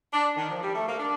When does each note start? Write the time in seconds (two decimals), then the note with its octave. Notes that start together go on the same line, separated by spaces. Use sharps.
0.12 D4
0.37 D#3
0.50 F3
0.62 G3
0.75 A3
0.87 A#3
0.99 D4